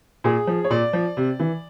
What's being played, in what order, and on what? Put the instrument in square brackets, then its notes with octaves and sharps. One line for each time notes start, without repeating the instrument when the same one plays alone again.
[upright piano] A#2 G#4
F3
C#5
A#2 D5
F3
C3
E3